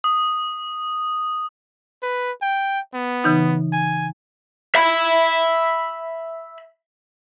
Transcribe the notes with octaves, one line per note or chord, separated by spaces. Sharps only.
D#6
B4
G5
B3
C#3 E3 D#4
G#5
E5 B5